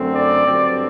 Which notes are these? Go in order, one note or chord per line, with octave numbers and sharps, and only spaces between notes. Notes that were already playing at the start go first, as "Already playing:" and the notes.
Already playing: F#2 D3 A3 C4
D5
G2 D3 F#3 C4